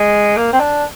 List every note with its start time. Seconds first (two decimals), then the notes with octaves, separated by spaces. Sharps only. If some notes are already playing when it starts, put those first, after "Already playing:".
Already playing: G#3
0.37 A#3
0.53 C4
0.60 D4